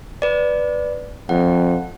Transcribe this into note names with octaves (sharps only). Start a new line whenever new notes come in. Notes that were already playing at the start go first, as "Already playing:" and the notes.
B4 D5
F2 F#5